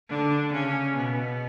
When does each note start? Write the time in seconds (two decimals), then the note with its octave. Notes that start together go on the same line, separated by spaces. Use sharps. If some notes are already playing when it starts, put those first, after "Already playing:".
0.09 D3 D4
0.53 C#3 C#4
0.97 B2 B3